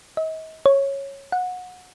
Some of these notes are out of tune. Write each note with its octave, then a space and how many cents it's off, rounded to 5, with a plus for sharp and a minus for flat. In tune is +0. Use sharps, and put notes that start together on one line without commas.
D#5 +40
C#5 -10
F#5 -25